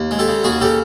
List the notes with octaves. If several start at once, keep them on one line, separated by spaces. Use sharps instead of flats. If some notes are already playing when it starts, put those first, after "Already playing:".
Already playing: D#2
G#3
G4 A4
C#3
D#2 F#4 G#4
C#3 G4 A4